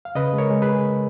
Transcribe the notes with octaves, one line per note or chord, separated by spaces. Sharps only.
F5
C#3 B4 D#5
G#3
A#4 C#5
G#3
G#4 B4